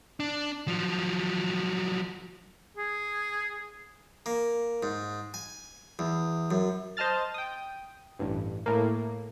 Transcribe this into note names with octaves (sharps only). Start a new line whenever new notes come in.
D4
F3 F#3
G#4
A#3
G#2
G#5
E2
F#2
C5 D#5 A5 F6 A6
G5 D#6
A1 G2
A2 A#3